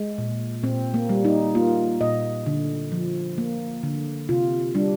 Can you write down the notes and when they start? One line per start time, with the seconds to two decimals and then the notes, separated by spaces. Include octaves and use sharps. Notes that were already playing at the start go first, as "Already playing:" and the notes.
Already playing: G#3
0.18 A#2
0.63 A#2 C4
0.94 A#3
1.09 G3
1.25 D#4
1.55 A#3 F4
2.01 A#2 D#5
2.46 D3
2.92 F3
3.38 A#3
3.83 D3
4.29 C3 F4
4.75 G3 D4